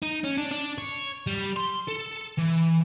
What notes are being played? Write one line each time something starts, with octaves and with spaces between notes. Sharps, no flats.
D#4
C#4
D4
D4
C#5
G3
C6
A4
E3